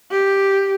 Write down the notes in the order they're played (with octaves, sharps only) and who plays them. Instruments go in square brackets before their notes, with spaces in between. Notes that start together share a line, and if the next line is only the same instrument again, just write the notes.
[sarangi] G4